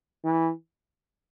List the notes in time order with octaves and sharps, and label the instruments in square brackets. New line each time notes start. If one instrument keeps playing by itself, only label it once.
[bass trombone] E3